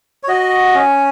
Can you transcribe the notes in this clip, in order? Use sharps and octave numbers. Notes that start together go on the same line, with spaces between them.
C#5
F#4 D#5
C#4